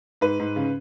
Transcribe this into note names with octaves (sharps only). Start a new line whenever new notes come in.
G#2 B4
G#2
C#3